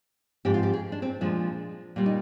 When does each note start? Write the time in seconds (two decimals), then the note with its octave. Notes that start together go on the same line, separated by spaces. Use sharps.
0.45 G#2 F3 C4 G4
0.54 F4
0.63 G4
0.73 G#4
0.92 D4
1.02 C4
1.21 A#2 F3 G#3 D4
1.96 A#2 G3 A#3
2.06 D#4